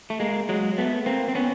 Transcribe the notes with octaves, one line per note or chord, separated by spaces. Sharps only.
A3
G#3 A#3
F#3 G#3
A3 B3
A#3 C4
C4
B3 C#4